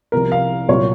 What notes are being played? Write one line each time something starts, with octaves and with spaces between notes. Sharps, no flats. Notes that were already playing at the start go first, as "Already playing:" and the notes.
C2 C3 F3 A#4
F5
C2 A#2 F#3 C#5